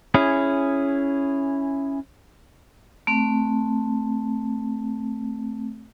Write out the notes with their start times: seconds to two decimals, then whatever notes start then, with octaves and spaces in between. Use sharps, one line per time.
0.14 C#4 E4 G#4
3.07 A3 C4